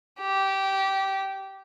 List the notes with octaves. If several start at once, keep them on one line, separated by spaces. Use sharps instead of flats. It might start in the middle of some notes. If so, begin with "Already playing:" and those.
G4